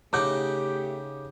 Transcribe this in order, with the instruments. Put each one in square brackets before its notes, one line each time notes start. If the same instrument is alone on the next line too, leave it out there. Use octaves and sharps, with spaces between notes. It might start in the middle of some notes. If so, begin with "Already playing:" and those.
[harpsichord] C#3 D#4 F#5 [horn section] A3 G4 [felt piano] D6 G6